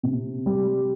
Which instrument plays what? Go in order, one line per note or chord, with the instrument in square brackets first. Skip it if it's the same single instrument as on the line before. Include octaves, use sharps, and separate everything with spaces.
[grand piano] C3
G3